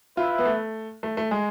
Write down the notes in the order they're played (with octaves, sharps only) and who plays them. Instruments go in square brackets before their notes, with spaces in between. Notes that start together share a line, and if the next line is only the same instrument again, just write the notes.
[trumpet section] E4 B4 E5 [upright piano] F4
[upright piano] B3
A3
A3
A3
G#3